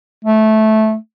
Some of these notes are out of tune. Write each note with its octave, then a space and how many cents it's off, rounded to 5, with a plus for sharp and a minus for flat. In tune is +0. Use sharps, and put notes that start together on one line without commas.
A3 -15